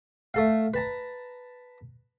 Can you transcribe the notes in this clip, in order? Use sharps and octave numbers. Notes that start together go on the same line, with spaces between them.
A3 A4 F5
B4 A5 A#5